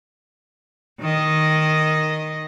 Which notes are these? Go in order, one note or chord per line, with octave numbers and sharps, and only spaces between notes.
D#3 D#5